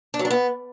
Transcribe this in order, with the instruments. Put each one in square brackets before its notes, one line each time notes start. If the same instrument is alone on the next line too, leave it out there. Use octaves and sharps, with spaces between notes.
[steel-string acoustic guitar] D4
F#3
D4
B3